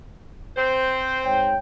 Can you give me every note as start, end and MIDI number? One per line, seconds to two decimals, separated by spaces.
0.57 1.48 60
0.57 1.48 72
1.25 1.56 44
1.25 1.56 73
1.25 1.56 79